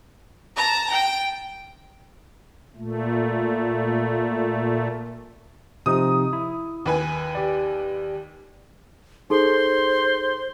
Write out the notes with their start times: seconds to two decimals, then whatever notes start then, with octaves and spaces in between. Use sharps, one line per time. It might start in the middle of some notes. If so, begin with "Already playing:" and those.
0.56 A5 A#5
0.91 G5
2.76 A#2 A3
5.86 C3 F3 D#4 D#6
6.33 E4
6.86 D#2 B4 G#5
7.35 G4 D5
9.30 D#4 G#4 A4 C5 C6